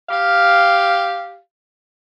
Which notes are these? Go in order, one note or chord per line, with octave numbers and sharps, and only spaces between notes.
G4 F5